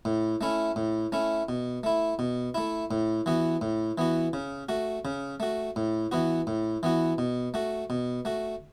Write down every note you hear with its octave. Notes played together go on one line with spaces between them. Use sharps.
A2
A3 C#4 E4
A2
A3 C#4 E4
B2
A3 E4
B2
A3 E4
A2
E3 B3 F#4
A2
E3 B3 F#4
C#3
A3 F#4
C#3
A3 F#4
A2
E3 B3 F#4
A2
E3 B3 F#4
B2
A3 F#4
B2
A3 F#4